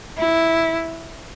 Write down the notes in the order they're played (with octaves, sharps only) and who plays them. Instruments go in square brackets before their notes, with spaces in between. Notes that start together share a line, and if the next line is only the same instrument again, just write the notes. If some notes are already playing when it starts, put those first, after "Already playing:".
[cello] E4